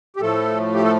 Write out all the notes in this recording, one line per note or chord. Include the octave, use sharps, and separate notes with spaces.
G4
A2 F3 A3 A4
G4
A4